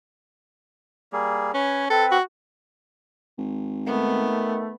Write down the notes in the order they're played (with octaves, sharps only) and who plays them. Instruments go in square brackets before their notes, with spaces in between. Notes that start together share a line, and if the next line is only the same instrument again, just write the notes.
[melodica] G3 A#3 G#4
[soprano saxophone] C#4 [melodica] B4 C#5
[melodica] C4 B4 [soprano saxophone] A4
[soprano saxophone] F#4
[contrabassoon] G#1
[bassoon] D#3 [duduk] A3 [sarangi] B3